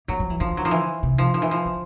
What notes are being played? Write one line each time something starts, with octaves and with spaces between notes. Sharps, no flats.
F#3 A#3
F3
E3
D3 F3
F#3
F3
E3
C3
F3
F3
E3
F3
D3